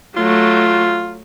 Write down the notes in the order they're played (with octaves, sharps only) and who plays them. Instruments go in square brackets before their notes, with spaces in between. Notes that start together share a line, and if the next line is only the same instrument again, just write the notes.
[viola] F#3 A3 [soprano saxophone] F4